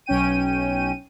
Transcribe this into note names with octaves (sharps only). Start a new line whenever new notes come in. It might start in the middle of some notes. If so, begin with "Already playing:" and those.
B1 C#4 G5 D#7